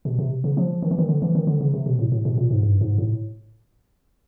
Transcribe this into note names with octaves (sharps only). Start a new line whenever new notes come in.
B2
C3
C#3
F3
D#3
E3
D#3
D3
E3
D#3
D3
C#3
C3
B2
A2
A2
B2
A#2
G#2
G2
G#2
A2